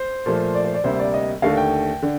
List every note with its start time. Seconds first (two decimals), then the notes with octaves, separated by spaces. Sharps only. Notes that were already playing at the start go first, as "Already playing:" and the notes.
Already playing: C5
0.26 A#2 F3 A3
0.55 D5
0.65 C5
0.74 D5
0.84 D2 C3 G3 A#3 C5
0.99 D5
1.14 D#5
1.42 D#2 D3 A3 F5
1.57 G5
2.02 D3